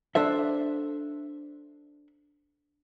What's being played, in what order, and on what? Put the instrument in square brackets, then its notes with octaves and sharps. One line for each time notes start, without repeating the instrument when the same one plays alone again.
[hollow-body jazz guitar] D4 A4 C5 E5